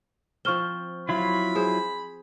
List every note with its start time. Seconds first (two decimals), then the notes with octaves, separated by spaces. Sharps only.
0.45 F3 C4 C#6 F6 G7
1.09 F#3 E4 F4 B5
1.55 G#4 C5